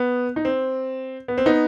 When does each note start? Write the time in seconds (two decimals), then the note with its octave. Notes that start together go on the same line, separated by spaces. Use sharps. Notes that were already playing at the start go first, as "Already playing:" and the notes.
Already playing: B3
0.36 D#4
0.45 C4
1.28 B3
1.38 C4
1.46 B3 D#4